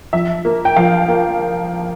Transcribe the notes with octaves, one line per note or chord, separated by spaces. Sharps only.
F3 E5
A#3
G5
F3 F5
A#3